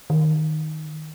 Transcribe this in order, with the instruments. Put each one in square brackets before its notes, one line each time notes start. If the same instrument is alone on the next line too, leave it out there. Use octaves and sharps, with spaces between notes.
[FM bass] D#3